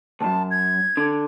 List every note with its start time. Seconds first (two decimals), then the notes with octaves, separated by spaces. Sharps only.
0.21 C#2 F#2 A5
0.51 G#6
0.97 D3